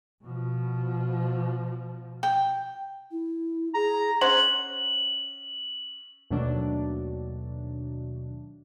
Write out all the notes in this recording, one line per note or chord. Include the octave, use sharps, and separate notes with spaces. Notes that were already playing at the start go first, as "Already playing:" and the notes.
B2 F3
G5
E4
G#4 A#5
C#4 C5 F#5 F#7
D#2 B2 D#3 F#3 A3 D4